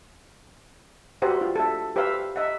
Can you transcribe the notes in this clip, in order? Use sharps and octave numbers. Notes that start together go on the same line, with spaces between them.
F#4 G4 B4 C5 E5 F#5
F4
A4 E5
G4 B4 C5 E5 F5 E6
D#5 E5 F#5